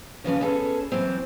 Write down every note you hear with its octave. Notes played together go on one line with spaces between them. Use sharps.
C#3 E3 F3 C#4
B3 C#4 G#4 A4
E3 F#3 C4